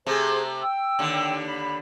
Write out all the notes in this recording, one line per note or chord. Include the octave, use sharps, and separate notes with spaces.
C3 A3 G#4 C5
G5 E6
D#2 D3
B5